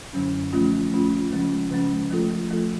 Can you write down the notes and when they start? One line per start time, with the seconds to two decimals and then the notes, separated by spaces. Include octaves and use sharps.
0.13 F#2 D3 F#3 C#4
0.53 F3 A3 C#4 F4
0.92 F3 A3 C#4 F4
1.32 C#3 F3 G#3 C#4
1.71 C#3 F3 G#3 C#4
2.11 F3 A3 F4 A4
2.50 F3 A3 F4 A4